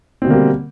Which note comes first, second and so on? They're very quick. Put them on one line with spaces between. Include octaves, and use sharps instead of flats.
C4 B2 D3 A#3 G3